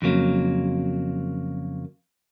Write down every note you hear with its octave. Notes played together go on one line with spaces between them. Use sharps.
F2 C#3 F#3 A#3